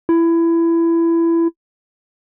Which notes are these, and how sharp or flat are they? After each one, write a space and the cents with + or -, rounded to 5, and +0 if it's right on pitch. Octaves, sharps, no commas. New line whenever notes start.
E4 +20